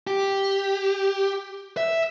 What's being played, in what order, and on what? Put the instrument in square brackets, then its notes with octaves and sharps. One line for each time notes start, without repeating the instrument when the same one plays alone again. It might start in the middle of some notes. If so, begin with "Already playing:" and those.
[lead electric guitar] G4
E5